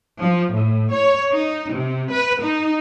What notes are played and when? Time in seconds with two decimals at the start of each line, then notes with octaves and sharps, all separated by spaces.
0.23 F3
0.53 A2
0.94 C#5
1.33 D#4
1.73 C3
2.12 B4
2.43 D#4